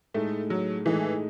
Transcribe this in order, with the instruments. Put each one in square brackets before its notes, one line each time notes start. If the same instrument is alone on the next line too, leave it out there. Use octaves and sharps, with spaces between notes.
[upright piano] A2 G#3 D#4 [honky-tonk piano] A3
[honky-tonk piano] F#3
[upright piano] A2 G#3 D#4 [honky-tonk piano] E3